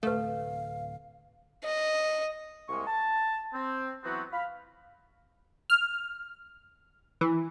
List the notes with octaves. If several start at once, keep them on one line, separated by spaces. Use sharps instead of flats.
D1 C3 A3 A4 B4 F5
D#5
C2 G#3 A#3 C#6
A5
C4
E3 F#3 B3 C4 F#4
F5 B5
F6
E3